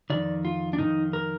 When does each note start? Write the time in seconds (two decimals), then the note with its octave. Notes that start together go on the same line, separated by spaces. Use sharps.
0.10 F2 C3 D#3 D5
0.45 F4
0.73 D4
0.78 F2 C3 D#3 D#4
1.13 A#4